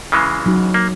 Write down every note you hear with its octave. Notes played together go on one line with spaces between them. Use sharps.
C#3 E3 G#3
F#3 D#4 F#4
A#3